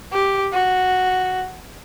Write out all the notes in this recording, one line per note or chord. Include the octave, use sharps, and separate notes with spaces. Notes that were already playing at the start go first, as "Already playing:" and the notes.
G4
F#4